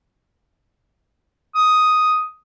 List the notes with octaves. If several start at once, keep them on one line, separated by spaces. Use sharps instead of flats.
D#6